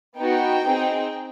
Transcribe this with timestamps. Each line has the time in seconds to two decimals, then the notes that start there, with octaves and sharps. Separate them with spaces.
0.18 B3 D#4 F#4 G5
0.64 C4 D#4 G#4